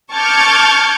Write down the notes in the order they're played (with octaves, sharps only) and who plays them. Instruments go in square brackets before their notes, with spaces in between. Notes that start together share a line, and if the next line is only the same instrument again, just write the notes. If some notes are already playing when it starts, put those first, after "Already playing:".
[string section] A5 C#6 D6 F6 G6 G#6